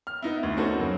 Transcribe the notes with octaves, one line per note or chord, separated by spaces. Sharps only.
F6
B3 D#4 E4
D2
C#4 D#4 F#4 A4 B4 C5
F#2 C#3 F#3 A#3